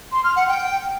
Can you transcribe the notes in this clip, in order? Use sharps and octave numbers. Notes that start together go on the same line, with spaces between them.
C6
F6
F#5
G5